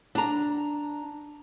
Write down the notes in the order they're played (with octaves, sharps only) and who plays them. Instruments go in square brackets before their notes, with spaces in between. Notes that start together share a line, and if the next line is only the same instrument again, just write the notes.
[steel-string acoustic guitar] D4 A#5